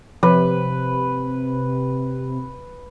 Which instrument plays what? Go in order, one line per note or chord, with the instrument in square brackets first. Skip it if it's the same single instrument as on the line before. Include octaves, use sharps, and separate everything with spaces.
[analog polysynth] C3 [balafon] F3 [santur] B4